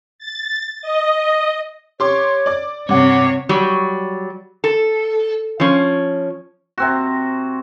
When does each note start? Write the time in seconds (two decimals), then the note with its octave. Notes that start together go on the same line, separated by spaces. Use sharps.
0.19 A6
0.82 D#5
2.00 G4 C#5 C6 D6
2.46 D5 D6
2.89 G2 C3 C#5 F#5 D6
3.49 F#3 G3
4.64 A4
5.60 F3 C#4
6.78 C3 C4 F#4